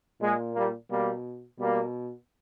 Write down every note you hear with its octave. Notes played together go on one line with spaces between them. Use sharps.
A#2 G#3
G3 A#3
B2 G3 A#3
B2 G3 A#3